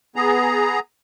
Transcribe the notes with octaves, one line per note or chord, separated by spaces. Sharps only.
B3 G#4 A#5